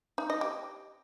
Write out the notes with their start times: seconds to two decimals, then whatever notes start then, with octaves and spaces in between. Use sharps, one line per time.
0.18 D#4
0.30 D#5
0.41 G4